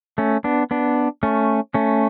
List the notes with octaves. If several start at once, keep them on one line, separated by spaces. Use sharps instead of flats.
A3 C#4
B3 D4
B3 D4
A3 C#4
A3 C#4